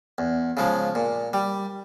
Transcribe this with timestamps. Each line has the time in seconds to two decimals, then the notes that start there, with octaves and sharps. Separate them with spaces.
0.18 E2
0.57 C#3 F3 G#3
0.95 A#2
1.33 G3